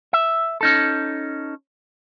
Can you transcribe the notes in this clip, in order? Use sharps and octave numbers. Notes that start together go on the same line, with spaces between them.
E5
C#4 D#4 A4